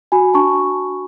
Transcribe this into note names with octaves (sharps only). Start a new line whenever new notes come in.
F#4 G#5 B5
D4 A5 C#6